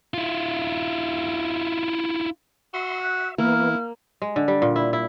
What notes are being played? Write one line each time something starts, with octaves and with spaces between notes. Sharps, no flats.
E4 F4
F#4 E5 C6
E5 F#6
E3 A#3 B3 E4 F6
G#3
D3
G3
A#2
E4
E4